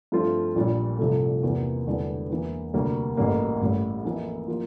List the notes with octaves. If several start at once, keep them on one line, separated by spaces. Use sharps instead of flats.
G2 F3 A3 C4 F4
A#1 A#2 G3
C2 C3 F3 A3
E2 C3 E3 A#3
E1 E2 D3 G3 D4
E2 E3 A#3
D2 C3 G3 A#3
A1 A2 G3 A#3
A1 A2 G3
F2 E3 A#3 E4
F3 A#3 F4